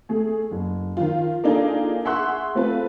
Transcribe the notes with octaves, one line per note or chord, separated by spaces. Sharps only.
A3 G#4
F#1
D#3 F3 F4
A#3 D4 D#4 F4 G#4 A4
G#4 E5 F#5 C6 C#6 F#6
A3 C4 F4 A4 B4